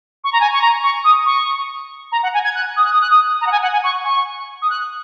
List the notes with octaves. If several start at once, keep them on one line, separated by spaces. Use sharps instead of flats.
C#6
A#5
G#5
C#6
A#5
C#6
D#6
C#6
A#5
F#5
G#5
G#6
F#6
D#6
F#6
D#6
F#6
D#6
A#5
F#5
G#5
F#5
G#5
C#6
C#6
D#6
F#6